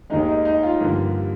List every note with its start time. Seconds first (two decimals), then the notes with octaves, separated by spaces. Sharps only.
0.10 D#2 D#3 G#3 D#4
0.28 D#4
0.45 D#4
0.63 F4
0.80 G2 D3 F3 A#3